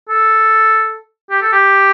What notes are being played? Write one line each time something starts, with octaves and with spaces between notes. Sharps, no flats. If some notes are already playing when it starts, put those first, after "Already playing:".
A4
G4
A4
G4